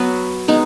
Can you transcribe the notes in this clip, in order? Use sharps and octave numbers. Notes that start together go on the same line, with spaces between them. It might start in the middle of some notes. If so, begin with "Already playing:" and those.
Already playing: F#3 B3 F#4 B4
G#3 B3 D#4